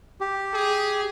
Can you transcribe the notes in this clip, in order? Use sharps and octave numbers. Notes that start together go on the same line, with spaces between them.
G4
G#4